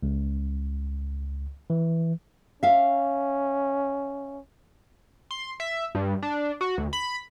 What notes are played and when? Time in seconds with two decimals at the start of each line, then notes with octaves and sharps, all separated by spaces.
0.03 C#2
1.70 E3
2.63 C#4 E5 F5
5.31 C6
5.60 E5
5.95 G2
6.23 D4
6.61 F#4
6.78 D2
6.93 B5